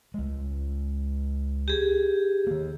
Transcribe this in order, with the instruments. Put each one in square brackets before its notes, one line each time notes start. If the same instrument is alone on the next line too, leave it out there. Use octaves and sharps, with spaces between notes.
[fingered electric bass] C#2 G#3
[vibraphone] G4 G#4
[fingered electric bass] D#3 A#3